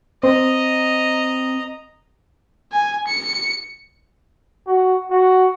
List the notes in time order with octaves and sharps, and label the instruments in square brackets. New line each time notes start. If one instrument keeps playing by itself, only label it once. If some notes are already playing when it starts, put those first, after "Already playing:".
[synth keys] C4 [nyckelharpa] D#5 A#5
[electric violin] G#5
C#7
[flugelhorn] F#4
F#4